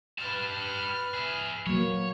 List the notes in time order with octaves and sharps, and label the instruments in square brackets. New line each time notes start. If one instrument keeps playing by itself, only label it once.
[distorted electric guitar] G3 A5 [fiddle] B4 F6
[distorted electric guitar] G#4 E5
[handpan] F#3 A#3 [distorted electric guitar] C#5